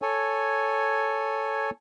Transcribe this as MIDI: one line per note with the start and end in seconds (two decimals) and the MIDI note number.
0.02 1.70 69
0.02 1.70 73
0.02 1.70 80